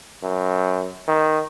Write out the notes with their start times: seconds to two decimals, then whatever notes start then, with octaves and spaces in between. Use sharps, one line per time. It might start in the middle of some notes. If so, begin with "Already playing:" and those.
0.23 F#2
1.08 D#3